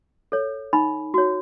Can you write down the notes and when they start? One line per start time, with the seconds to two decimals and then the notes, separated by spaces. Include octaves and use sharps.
0.32 A4 C#5
0.73 D#4 B5
1.14 F#4 C#5